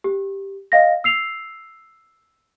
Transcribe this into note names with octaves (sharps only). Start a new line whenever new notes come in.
G4
D#5 F5 A#6
E6 C7 F7